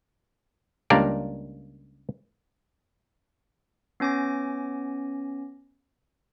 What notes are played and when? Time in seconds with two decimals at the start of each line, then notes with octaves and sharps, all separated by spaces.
0.90 C#2 G3 A#3 D4 A#4 D5
4.00 B3 C#4 G#5 D6 A#6